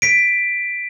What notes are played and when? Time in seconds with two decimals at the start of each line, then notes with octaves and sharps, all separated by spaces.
0.02 B6 D7